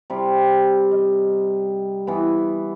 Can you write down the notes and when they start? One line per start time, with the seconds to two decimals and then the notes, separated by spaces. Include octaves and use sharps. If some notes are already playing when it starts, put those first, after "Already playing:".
0.10 C3 G3
0.91 D#5
2.07 E3 B3